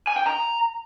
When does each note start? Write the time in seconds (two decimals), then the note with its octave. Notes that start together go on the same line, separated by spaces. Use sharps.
0.07 G#5
0.17 G5
0.26 A#5